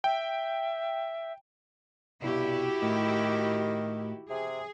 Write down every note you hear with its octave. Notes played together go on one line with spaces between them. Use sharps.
E5 G5
C2 G2 B2 E4 F#4 G4
A2 D#3
C3 G#4